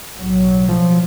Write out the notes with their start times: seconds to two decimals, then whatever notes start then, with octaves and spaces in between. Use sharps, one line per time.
0.17 B1 A2 F#3
0.69 F3